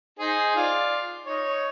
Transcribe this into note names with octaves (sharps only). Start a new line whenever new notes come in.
D#4 G#4 C5
F4 D5
D#4 C#5